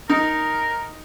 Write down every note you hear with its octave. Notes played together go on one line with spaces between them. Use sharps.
D#4 A#4